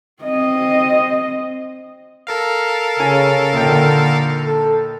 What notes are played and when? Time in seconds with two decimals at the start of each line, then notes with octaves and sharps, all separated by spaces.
0.23 C4 D#5
2.27 A4 A#4 F5
2.99 C#3 C#4 G#5
3.53 A#1 D#2 D3 G5
4.44 A4